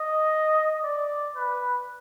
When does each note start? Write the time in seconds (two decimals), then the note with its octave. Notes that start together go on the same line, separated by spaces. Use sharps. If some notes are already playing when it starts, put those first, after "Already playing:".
Already playing: D#5
0.84 D5
1.36 B4